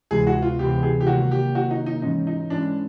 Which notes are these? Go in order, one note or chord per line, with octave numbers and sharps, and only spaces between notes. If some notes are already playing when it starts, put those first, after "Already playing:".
D2 C3 E3 G#3 B3 G#4
F#4
F4
D2 C3 E3 G#3 B3 G4
G#4
G4
C3 D#3 F#3 A#3 F#4
G4
C3 D#3 F#3 A#3 F#4
D#4
D#4
G#2 E3 G#3 C#4 D#4
D#4
G#2 E3 G#3 C#4 D4